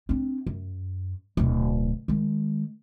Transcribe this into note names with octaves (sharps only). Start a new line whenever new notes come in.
C4 D4
F#2
D1 B2
D#3 G#3